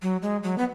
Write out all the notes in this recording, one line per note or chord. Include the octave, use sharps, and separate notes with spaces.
F#3
G#3
F#3
B3